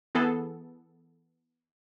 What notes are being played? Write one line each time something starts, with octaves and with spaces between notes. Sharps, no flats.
E3 B3 G#4 A4